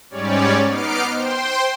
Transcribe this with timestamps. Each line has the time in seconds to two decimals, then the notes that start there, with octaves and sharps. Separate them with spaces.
0.10 G#2 G3 C#4 C#5 D5
0.67 B3 D#4 D6 F6 C7 D7
1.12 C5 G5 C6